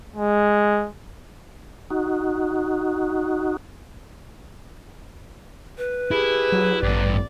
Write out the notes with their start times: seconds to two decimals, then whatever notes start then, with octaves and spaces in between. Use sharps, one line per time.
0.16 G#3
1.90 D#4 F#4
5.78 B4
6.11 E4 G4 G#4
6.52 F#3
6.83 A1 G2 B3 D5